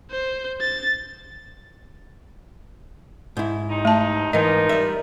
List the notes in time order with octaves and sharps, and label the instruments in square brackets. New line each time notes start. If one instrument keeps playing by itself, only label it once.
[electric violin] C5
A6
[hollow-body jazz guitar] G#2 E4
[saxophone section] E2 C3 D#4
[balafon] A3 A5
[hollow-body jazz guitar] G#2 E3 [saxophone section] F3 D#4 [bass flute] A#4 [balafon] D#5
[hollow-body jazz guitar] G3 E5